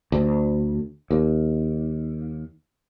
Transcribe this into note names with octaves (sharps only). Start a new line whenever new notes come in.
D2
D#2